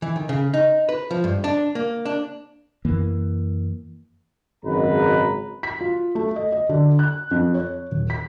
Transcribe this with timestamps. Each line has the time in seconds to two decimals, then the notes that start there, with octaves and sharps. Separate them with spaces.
0.02 E3
0.16 D#3
0.29 C#3
0.54 D#4
0.89 B4
1.11 F3
1.24 G2
1.44 D4
1.75 A#3
2.05 D4
2.85 F#2 E3 A#3
4.65 G#1 F#2 C#3 G#3 B4 A#5
5.63 B6
5.81 F4
6.15 A3
6.36 D#5
6.52 D#5
6.69 D3
6.99 F#6
7.31 F2
7.54 C#5
7.91 D#1
8.10 B6